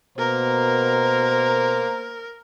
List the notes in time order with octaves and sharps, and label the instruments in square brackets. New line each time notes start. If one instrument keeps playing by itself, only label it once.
[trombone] B2 [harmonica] A#3 [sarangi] A#4 [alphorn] C5